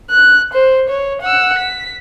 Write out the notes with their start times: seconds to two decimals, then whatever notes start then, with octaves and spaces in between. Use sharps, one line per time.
0.11 F#6
0.53 C5
0.89 C#5
1.22 F#5 E6
1.58 B6